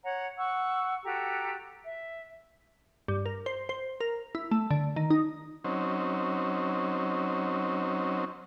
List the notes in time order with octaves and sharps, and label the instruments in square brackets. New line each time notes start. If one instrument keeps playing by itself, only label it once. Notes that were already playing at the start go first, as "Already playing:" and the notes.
[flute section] C#5 F#5 A#5
F#5 C#6 E6
F#4 G4 A4 A#5
E5
[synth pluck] G2
A#4
C5
C5
A#4
E4
A3
D3
D#3
D#4
[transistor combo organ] F#3 C4 C#4 D#4